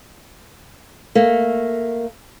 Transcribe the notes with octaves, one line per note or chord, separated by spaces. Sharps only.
A3 A#3